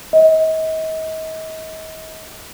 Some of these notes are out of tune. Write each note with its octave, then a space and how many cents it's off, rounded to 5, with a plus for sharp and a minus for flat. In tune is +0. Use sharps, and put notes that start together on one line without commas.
D#5 +40